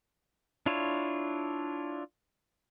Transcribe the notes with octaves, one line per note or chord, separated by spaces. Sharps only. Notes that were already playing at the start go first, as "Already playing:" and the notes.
D4 E4 F4 C#5